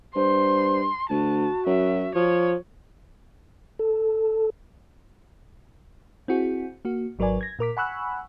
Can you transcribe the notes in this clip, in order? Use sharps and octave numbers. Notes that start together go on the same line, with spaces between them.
G2 C5 C6
D2 F#4 A5
F#2 E5
F3 C#5
A4
C4 E4 F#4 G#4
A#3 F#4
G#1 F#3 A#4 B4 D5 G#5
G#6 A#6
A#2 A#4 D6 B6
F#5 G#5 B5 C#6 E6 F#6